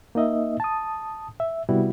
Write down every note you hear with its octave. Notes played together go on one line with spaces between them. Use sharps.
A#3 D#4 D#5 E5
A5 D#6
E5
C3 G3 B3 E4 F#4